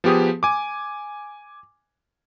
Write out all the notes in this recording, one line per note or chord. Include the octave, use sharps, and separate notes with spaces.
F3 B3 G4 G#4 D#6
G#5 D6